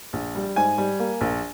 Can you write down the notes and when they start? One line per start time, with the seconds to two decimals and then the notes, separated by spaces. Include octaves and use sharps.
0.13 A#1
0.35 G3
0.56 G#2 G#5
0.78 G3
1.00 A#3
1.21 A#1